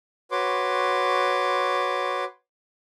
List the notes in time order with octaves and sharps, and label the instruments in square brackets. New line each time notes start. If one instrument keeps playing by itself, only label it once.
[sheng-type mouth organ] F#4 B4 C#5 C6 D6